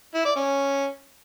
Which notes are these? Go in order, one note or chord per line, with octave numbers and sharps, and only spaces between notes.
E4
D5
C#4